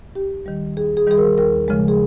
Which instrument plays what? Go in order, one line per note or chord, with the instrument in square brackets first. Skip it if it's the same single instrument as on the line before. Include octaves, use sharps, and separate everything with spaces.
[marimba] D#2 G4
D#3 G3
D#2 G#4
G#4
D#3 G3 G#4
A#4
D#2 A#4
C#3 F3 G#3
G#4